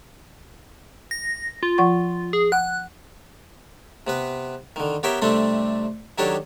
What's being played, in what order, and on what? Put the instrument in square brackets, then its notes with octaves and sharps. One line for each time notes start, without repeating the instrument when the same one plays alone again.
[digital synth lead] A#6
F4
[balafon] F3 F#5 C#6
[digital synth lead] G#4
[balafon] F#5 [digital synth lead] F#6
[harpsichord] C3 B3 B4
D3 D#3
B3 G4 A#4 C#5 E5 G5
C3 G3 A3 C4 D4 A4
D#3 F#3 D4 G4 A4 C#5